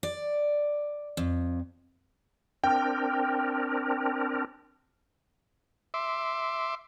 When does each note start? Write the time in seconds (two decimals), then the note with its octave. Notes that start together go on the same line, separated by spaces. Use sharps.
0.03 D5
1.17 F2
2.64 C4 D4 A#4 G5
5.94 E5 C6 D6